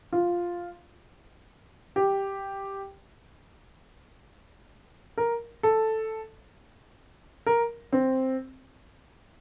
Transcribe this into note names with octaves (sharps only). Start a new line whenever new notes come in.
F4
G4
A#4
A4
A#4
C4